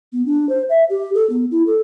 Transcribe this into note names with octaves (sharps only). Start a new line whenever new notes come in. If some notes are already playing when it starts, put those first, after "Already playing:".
B3
D4
C5
E5
G4
A4
B3
E4
A4